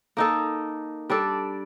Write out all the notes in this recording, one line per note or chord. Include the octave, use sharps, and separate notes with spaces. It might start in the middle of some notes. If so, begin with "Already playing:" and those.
A#3 D#4 A4 D#5
G3 D4 A4 D5